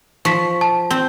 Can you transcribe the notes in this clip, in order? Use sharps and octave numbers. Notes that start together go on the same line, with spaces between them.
F3 C#6 B6
A5
C4